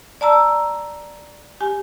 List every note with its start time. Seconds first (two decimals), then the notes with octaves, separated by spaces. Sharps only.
0.21 D5 A5 A#5 E6
1.61 G4 G#5